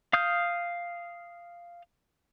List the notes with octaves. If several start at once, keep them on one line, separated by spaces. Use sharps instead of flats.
F5 D#6 F6 G6